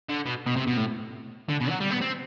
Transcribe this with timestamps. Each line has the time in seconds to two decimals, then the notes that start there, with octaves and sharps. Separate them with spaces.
0.09 D3
0.26 B2
0.46 B2
0.56 C3
0.67 B2
0.77 A2
1.49 D3
1.61 B2
1.70 F#3
1.81 G3
1.91 B3
2.01 C4